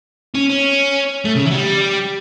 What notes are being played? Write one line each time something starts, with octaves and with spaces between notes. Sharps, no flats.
C#4
C#4
A3
C#3
E3
F#3
G3